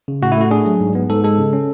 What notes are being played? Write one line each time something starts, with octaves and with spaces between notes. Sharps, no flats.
C#3
A2 F#4
E4
A3 F#4
D4 G#4
F#3
G#2
B3
G#2 A4
G#3 A4
C#3
C#4